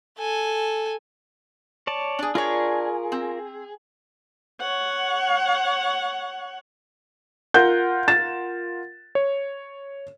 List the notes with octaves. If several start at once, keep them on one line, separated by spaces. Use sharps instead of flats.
A4 G#5
C#5 D5 A5
D4 G#4
D4 F4 G#4 A#4 C#5 C#6
C4
C#5 F#5
F4 A#4 F#5 G6
A6 E7
C#5